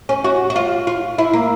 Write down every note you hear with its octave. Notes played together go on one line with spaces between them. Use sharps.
C#4
F#4
F#4
F4
F4
E4
A#3